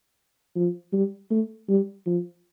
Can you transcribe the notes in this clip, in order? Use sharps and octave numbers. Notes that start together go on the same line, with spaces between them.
F3
G3
A3
G3
F3